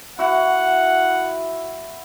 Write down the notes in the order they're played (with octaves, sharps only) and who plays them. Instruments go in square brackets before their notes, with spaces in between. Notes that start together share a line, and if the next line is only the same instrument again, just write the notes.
[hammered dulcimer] E4 F#4 [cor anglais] F#5